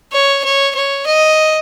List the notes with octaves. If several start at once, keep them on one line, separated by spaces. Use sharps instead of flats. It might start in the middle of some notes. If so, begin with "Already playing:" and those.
C#5
C#5
C#5
D#5